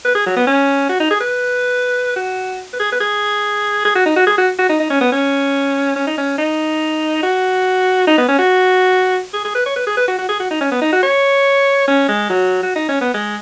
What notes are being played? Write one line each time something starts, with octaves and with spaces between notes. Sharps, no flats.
B4
G#4
F#3
B3
C#4
F#4
D#4
G#4
B4
F#4
B4
G#4
B4
G#4
G#4
F#4
D#4
F#4
G#4
F#4
F#4
D#4
D#4
C#4
B3
C#4
C#4
D#4
C#4
D#4
F#4
D#4
B3
C#4
F#4
G#4
G#4
B4
C#5
B4
G#4
B4
F#4
F#4
G#4
F#4
D#4
C#4
B3
D#4
F#4
C#5
C#4
G#3
F#3
F#4
D#4
C#4
B3
G#3